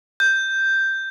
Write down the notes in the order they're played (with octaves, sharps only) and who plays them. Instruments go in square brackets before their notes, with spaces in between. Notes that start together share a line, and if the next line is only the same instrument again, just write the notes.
[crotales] G6